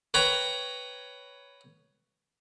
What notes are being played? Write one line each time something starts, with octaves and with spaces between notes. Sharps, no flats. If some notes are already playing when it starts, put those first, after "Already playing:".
B4 C#5 G5 A#5 B5